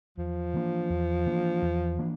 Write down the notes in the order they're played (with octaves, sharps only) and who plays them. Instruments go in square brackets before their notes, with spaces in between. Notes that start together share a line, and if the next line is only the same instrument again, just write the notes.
[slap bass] E2 [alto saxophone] F3
[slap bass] E3 A#3 D4
E2
E3 A#3 D4
E2
E3 A#3 D4